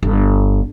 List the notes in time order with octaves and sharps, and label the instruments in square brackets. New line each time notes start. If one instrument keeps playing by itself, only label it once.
[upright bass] G1